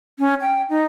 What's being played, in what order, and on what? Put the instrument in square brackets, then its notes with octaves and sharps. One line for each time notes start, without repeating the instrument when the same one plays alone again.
[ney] C#4
G5
D#4